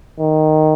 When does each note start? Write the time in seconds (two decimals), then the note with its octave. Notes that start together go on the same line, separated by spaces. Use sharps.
0.20 D#3